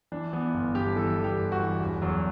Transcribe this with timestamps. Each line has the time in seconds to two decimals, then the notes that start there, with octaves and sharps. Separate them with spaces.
0.12 E3 D4
0.33 E3 B3
0.54 G1
0.75 G2 G4
0.96 E3 A4
1.16 E3
1.24 G4
1.38 G1
1.52 F#4
1.60 E3
1.80 E1
2.02 E2 F#3